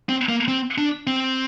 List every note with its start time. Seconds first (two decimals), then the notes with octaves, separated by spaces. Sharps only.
0.09 C4
0.29 A#3
0.48 C4
0.78 D4
1.07 C4